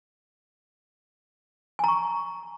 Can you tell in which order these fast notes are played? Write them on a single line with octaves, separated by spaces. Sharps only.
G#5 A#5 C#6